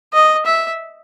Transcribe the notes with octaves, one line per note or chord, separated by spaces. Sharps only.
D#5
E5